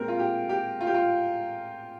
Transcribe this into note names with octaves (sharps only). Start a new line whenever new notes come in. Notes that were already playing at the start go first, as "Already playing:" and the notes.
Already playing: A#2 G#3 C4 A#4
F4
G4
G4
F4
G4
F4